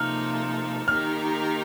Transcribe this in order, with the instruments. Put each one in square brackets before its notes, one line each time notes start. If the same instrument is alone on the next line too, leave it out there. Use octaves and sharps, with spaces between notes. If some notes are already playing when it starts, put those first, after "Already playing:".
Already playing: [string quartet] C3 F3 A#3 D#4 A4 [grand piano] F6
[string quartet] D#3 A#3 D#4 G4 A#4 [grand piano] F6